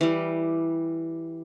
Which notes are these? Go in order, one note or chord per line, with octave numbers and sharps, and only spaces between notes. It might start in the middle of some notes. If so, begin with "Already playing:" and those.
E3 G3